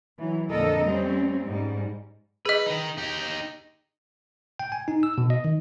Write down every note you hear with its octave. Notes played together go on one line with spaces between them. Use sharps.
E3 F#3
F2 A#2 D3 A4 A#4 D#5
G3 A3 C4 C#4
G#2 G3
G#4 B4 D#5
D#3 D#4
D#4 G4
G5
G#5
D#4
E6
B2
D#5
D#3